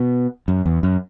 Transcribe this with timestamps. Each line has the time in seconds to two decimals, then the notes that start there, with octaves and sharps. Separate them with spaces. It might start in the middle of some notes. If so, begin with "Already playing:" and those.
Already playing: B2
0.48 F#2
0.66 E2
0.83 F#2